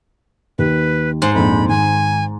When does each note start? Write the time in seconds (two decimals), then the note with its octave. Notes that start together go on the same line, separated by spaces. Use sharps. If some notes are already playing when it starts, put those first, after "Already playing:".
0.58 D#2 B4
1.22 G#2 C5
1.35 A#1 F2 B5
1.68 G#1 G#5